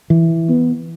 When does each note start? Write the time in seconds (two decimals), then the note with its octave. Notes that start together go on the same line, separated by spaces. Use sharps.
0.10 E3
0.49 B3